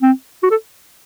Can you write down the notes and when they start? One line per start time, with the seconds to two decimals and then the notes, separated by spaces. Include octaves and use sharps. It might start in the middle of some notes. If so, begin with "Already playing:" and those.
0.02 C4
0.43 F#4
0.51 A4